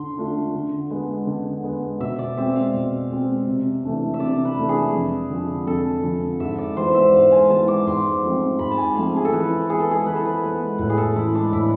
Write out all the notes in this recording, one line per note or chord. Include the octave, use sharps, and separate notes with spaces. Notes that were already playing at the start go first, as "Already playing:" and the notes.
Already playing: D3 D4 C6
A3 D4 F4
D3
G#3 B3
D3
G#3 B3
B2 E5
D5
G#3 C4 E5
F5
B2
G#3 C4
C3
E3 A3 D4
E5
C3 D5
B4
E3 A3 D4
G#4
F2
D3 F3
F2 A4
D3 F3
G#2 E5
D5
E3 G#3 B3 C5
E5
G#2 F5
G#5
E3 G#3 B3 A5
D6
G#2 C6
F3 A3 C4
G#2 B5
A5
G#5
F3 A3 C4 F5
G#4
A4
E3 B4
G#3 B3 G#4
A4
G#4
E3 B4
A4
B4
G#3 B3
A2 B4
G#4
A4
E3 G#3 E4
D4
A2 E4